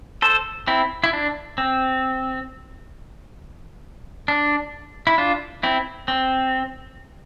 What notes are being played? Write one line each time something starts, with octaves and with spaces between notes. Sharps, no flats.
A4 C5
C4 E4
E4
D4
C4
D4
E4
D4 F4
C4 E4
C4